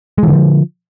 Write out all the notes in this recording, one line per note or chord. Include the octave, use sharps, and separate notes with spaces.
D3 E3 F3 G#3